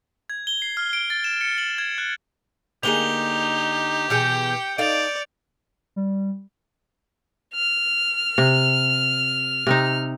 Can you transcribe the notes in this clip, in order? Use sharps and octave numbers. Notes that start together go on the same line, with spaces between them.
G#6
G7
C7
F6
D7
A6
E7
C#7
F#7
G#6
F#6
D3 A#3 D#4 G4 G#4 F7 G7
B2 E3 G#4 G5 G6 C#7
D#4 A4 D5 F5 D7 F7
G3
F6
C3
C3 C4 D#4